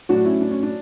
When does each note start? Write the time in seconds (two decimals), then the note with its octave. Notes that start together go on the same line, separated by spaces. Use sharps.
0.09 A2 F#3 D4 F#4
0.25 C#4 E4
0.41 D4
0.51 C#4
0.63 D4